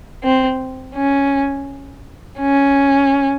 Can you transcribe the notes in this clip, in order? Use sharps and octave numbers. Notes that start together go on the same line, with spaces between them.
C4
C#4
C#4